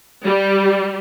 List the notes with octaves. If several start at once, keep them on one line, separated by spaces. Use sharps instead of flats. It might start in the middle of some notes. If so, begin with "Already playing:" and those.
G3